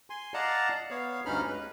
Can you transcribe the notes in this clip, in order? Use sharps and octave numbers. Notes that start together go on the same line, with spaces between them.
G#5 C6
D5 D#5 F5 F#5 A5 A#5
B3 C#5 F5
D2 G2 C#4 D#4 B5 F6
G#3 B4